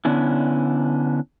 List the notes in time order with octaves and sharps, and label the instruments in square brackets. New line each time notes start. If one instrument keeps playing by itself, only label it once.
[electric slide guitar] D3 B3 C#4 D4 E4